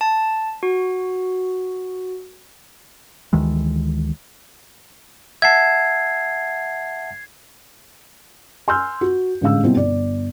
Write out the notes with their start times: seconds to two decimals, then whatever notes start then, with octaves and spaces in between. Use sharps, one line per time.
0.01 A5
0.63 F#4
3.33 D2 D#3 E3 G#3
5.42 E5 F#5 A5 G#6 C7
8.68 G#5 C6 E6 F6 G6
9.01 F#4
9.41 A1 D3 G#3 F5 E6
9.63 B2 G3 C4 E4
9.75 G1 D5